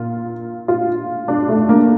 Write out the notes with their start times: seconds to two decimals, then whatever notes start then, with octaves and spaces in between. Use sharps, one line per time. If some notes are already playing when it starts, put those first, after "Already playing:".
Already playing: A#2 F4
0.68 F4
1.28 D4
1.49 A3
1.69 A#3